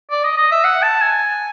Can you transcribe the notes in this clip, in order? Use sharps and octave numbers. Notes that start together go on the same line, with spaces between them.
D5
D#5
D#5
E5
F#5
A5
G#5